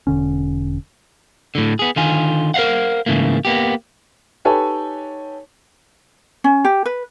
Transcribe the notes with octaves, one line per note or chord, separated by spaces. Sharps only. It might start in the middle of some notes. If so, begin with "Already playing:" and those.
E1 D3 C#4
A2 D3
B3 G#4
D3 D#3 F4 G#5
A#4 C5 D#5 F5 F#5
G#2 C#3 E3 A3 A#3
A#3 B3 G4
D#4 G4 A4 B4 C#5 G#5
C#4
G4
B4